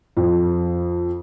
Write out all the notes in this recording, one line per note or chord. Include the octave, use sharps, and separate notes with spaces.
F2